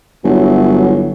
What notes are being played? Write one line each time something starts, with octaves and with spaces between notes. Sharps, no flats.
G1 F#3 E4